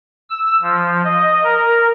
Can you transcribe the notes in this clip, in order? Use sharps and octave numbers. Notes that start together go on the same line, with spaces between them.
E6
F3
D#5
A#4